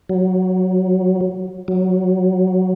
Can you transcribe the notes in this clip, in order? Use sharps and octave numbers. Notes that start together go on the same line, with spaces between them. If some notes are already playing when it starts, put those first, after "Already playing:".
F#3
F#3